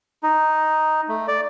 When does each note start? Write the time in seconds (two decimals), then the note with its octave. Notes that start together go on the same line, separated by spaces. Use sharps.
0.23 D#4
1.08 A3
1.28 D5